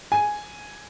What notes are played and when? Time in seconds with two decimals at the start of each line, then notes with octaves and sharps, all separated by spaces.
0.12 G#5